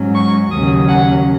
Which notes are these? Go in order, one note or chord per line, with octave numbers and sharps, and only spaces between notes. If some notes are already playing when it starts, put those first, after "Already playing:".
Already playing: G#2 F#3 C#4
C#6
D#2 C#3 F#3 C#4 D#6
F#5